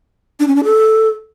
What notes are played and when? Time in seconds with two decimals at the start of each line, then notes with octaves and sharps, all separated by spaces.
0.40 D4
0.48 C#4
0.56 D4
0.64 A4